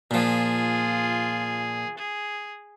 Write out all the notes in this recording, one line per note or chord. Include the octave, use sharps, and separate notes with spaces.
A#2 F3 F4 G#4
G#4